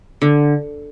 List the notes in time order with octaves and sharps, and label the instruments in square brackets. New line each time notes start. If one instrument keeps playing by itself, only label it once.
[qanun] D3